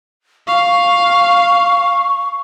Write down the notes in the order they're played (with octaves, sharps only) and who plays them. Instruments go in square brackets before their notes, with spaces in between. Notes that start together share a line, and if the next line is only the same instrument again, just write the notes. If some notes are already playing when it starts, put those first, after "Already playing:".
[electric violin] F5 [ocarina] C#6